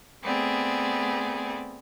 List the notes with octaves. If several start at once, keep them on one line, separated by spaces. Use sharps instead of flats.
A3 B3 C4 G#4 D5